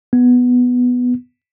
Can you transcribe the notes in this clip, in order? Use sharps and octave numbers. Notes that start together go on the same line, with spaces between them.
B3